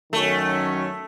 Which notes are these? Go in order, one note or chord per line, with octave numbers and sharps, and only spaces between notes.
F#2 D#3 F#3 A3 C#4